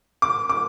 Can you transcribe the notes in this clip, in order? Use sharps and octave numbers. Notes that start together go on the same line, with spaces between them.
D6
D6